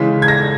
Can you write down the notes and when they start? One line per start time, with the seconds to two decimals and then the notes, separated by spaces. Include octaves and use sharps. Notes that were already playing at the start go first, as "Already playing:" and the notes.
Already playing: C#3 E3 G#3 B6
0.22 G#6
0.28 A#6